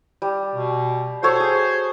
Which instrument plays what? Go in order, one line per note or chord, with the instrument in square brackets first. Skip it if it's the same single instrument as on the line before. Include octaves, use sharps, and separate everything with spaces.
[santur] G3
[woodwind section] B2
[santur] F#4 A4 C#5 [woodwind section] C5
[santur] G#4